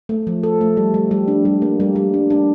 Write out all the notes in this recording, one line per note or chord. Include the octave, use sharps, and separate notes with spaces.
A3
F3
A4
A3
G3
G3
G3
D4
G3
A#3
G3
G3
D4
D4